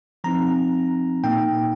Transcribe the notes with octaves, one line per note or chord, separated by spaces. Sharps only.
F3 C4 D#4 A#5
A#2 A#3 D#4 G5